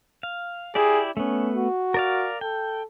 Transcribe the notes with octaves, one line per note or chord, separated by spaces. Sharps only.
F5
E4 G4 G#4 D5
A3 B3 C#4
F#4
A#4 D5 F5
A4 G5